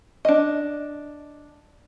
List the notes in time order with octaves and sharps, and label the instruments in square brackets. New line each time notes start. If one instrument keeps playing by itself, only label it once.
[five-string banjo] D4 D#5